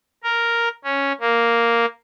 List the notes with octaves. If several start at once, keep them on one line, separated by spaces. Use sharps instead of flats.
A#4
C#4
A#3